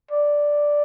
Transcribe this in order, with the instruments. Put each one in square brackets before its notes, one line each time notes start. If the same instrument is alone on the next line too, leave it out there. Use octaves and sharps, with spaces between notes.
[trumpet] D5